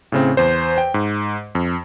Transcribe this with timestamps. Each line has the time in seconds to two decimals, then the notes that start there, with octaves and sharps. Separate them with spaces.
0.12 A2 C#3 C4
0.37 E2 C5
0.78 G5
0.94 G#2
1.55 F2